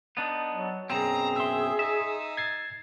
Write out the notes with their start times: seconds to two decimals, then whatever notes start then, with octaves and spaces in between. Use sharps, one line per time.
0.17 B3 D4 D#4
0.51 F#3
0.90 F#2 B2 C4 G#4 A#5 A#6
1.36 E5 C6 E6
1.79 D#4 E5
2.37 G#6 A6 C7